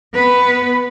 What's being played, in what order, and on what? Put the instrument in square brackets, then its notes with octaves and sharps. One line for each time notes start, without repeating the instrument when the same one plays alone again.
[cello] B3 B4